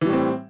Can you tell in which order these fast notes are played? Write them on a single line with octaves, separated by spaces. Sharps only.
E3 G3 A2 C4